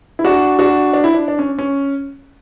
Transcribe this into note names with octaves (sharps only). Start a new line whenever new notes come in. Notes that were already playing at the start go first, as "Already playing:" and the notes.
E4
D4 F#4
D4 F#4
D4
E4
D4
D4
C#4
C#4